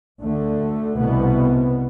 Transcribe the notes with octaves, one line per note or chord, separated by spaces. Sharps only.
D2 D3 A3
C2 B2 B3